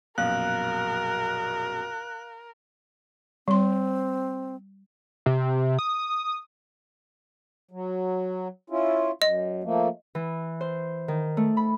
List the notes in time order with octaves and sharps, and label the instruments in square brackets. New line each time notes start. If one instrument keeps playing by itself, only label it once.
[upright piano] A#1 F#2 B2 [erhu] A#4 [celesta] F5 [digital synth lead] F#6
[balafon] G3 C6 [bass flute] C4
[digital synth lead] C3
D#6
[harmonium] F#3
C#4 E4 F4
[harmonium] F#2 [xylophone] D#5
[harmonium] F3 A3 A#3
[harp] E3
C5
D#3
A3
B5